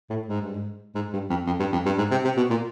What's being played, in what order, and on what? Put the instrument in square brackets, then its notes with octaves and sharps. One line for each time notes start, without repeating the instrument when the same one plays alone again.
[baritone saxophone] A2
G#2
G2
G#2
G#2
G2
F2
F2
G2
F2
G2
G#2
C3
C3
B2
A#2